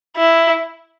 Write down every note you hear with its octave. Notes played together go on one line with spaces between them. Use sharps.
E4